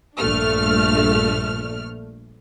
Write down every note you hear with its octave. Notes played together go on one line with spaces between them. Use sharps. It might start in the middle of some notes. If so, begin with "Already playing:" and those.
A#1 G2 A3 D4 F6